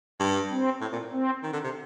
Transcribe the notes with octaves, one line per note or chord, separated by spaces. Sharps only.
G2
C4
A2
A#2
C4
D#3
D3
C3